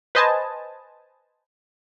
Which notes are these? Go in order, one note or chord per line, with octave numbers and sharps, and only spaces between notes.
B4 C5 D#5 G#5 A5